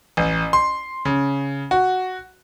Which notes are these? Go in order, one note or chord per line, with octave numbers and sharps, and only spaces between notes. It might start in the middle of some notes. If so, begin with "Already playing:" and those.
A1
C6
C#3
F#4